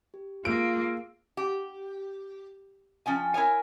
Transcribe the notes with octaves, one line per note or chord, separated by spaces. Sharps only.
G4
A#3 F4 G#4 E6 C7 D7
G4
F3 C#4 G5 G#5
E4 A#4 C#5 G#5